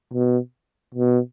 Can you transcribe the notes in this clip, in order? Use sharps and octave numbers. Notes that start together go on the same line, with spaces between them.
B2
B2